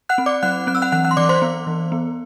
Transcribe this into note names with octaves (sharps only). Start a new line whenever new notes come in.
F#5 F#6
C4
D5 D6
F#3 F#5 F#6
C4 F#6
E6
F#5 F#6
E3 F#5 F#6
F#5 F#6
C6
E3 D5 D6
C5 C6
B3
E3
B3